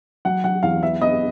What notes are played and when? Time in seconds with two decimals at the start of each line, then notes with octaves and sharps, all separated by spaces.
0.25 F#3 F#5
0.44 F#3 F#5
0.63 E2 F5
0.83 B3 E5
1.01 B3 D#5